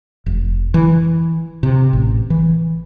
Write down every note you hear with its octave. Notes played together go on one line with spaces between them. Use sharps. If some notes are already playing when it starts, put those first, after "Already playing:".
F1
E3
C3
A1
E3